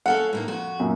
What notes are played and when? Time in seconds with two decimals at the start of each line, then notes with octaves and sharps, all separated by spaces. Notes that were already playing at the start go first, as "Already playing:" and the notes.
0.06 C#4 A4 F5 F#5
0.33 A2 A#3 D#4
0.48 F2 F#4
0.80 F#2 A#2